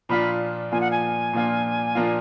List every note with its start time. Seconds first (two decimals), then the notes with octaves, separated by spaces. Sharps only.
0.09 A#2 F3 A#3 D4 F4 B5
0.72 A#2 F3 A#3 D4 F4 G#5
0.81 F#5
0.91 G#5
1.33 A#2 F3 A#3 D4 F4
1.95 A#2 F3 A#3 D4 F4